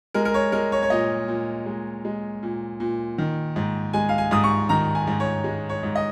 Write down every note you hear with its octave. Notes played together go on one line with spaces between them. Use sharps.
G#3 A#4
A#4
C#5
G#3 A#4
C#5
C#5
A#2 D#5
A#2
G#3
G#3
A#2
A#2
D#3
G#2
G#3 G#5
F5
G#5
G#2 D#6
C#6
D#3 A#5
G#5
G#2
C#5
G#3
C#5
G#2
D#5